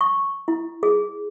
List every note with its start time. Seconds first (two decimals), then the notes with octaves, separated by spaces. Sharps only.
0.01 C#6
0.48 E4
0.83 G#4